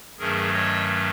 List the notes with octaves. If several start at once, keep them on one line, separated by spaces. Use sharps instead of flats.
G2 D#3 F#3 A3 C#4 G#4 A#4
C#5 D#5